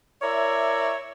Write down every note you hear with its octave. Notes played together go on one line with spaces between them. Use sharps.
E4 A#4 C#5 D5 E5